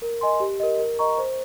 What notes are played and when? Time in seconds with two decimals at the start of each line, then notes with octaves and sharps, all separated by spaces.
0.02 A#4
0.21 D#5 G#5 C6
0.40 G4
0.60 A#4 D#5
0.79 A#4
0.99 D#5 A#5 C#6
1.18 C5